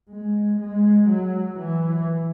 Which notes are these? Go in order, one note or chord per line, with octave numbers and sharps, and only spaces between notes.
G#3
G#3
F#3
E3